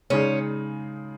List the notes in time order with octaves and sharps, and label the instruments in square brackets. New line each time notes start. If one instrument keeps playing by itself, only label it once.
[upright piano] C#3 G#3 D#4 G#4 [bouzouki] C#4